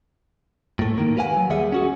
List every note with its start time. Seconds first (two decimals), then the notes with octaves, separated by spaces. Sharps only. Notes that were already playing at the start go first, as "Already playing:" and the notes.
0.79 A2 A3
0.98 D#3 A#3
1.17 G4 B4 F5 F#5 G#5
1.37 F#3
1.50 D#2 G3 G#4 E5 F#5
1.72 C#4 F#4 G#4